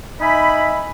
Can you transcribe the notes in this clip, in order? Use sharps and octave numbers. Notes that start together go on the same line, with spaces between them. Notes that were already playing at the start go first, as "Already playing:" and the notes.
D#4 E5 G#5 B5